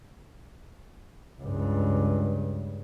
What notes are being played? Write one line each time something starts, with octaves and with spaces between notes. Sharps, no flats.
C#2 G2